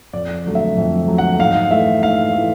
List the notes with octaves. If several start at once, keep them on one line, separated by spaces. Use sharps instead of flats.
F2 D5
D3 F#3 A3
E5
F2
D3 F#3 A3
F#5
G#2 F5
E3 A3 E5
G#2 F5
E3 A3